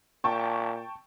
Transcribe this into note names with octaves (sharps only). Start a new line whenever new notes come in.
A#2 G5 A5 C#6